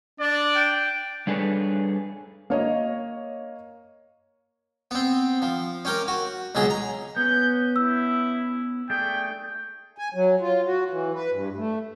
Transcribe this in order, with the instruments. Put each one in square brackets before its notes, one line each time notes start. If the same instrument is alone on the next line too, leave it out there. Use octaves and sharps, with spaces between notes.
[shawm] D4 [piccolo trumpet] D5
[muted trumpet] G5
[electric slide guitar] G3 D4 G#4 A4 B4 C#5
[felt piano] A#3 C#5 D#5
[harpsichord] B3 C4
F3
C#4 G4 A#4
F#4
C#2 B2 F#3 G#4 D#6
A#5
[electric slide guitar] B3 C#4 [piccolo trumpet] G6
[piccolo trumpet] E4 [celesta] E6
[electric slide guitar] A3 D4 G#4 [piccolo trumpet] G5
[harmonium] G#5
F#3
F4
F#4
E3
B4
G2
A3